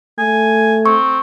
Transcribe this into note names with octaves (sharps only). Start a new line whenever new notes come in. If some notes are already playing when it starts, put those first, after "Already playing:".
A3 G#5
C4 C#6